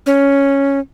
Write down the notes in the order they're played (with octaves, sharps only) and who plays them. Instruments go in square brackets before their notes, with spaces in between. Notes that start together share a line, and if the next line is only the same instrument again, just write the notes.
[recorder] C#4